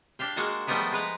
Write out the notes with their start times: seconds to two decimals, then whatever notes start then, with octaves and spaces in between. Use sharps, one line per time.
0.19 D4 G4 F5 G5
0.36 G#3 A#3 F#4 F#5 A5
0.67 F3 G3 A3 B3 D#4 E4
0.92 G#3 B4 A#5